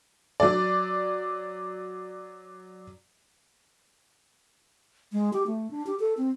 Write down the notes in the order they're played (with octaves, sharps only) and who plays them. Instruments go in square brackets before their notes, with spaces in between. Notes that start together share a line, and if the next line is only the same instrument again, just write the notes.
[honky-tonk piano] F#3 D5
[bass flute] G#3
G4
A3
D4
G4
A4
C4